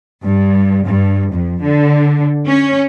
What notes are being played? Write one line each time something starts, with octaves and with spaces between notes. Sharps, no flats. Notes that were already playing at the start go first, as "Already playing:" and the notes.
G2
G2
F2
D3
C#4